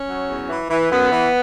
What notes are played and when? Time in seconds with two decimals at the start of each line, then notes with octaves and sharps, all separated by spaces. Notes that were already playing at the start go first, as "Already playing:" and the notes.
Already playing: C#4
0.08 F#3
0.29 E2
0.49 E3
0.70 E3
0.91 F#2 B3
1.12 E3